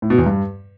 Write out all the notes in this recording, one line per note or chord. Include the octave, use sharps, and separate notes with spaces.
A2
B2
E2
G2